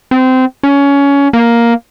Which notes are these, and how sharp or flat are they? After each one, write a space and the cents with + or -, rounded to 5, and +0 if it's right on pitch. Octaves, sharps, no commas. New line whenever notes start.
C4 -20
C#4 +20
A#3 +5